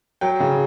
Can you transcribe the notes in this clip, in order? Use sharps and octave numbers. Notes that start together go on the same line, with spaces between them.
F#3 G5
C#3